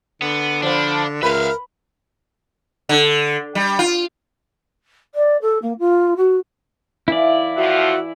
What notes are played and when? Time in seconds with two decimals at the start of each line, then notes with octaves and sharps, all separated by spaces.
0.22 D3 B3
0.63 F3 B3 D4
1.23 C#2 A#4 B4 E5 F5
2.89 D3
3.55 G3
3.79 F4
5.15 D5
5.42 A4
5.62 A#3
5.79 F4
6.17 F#4
7.08 E3 E4 D5 F5
7.57 A2 F3 F4 F#4 E5 F#5